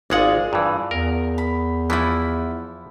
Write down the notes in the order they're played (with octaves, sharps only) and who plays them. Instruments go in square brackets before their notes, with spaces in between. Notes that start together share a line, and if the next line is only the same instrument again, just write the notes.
[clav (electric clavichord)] G#1 G#3 F#5 [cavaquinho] F4 G#4 D5
[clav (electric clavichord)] G2 E3
[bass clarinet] E2 [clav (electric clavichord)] A#4
[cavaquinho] B5
[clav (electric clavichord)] E3 F3 [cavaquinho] E4 B5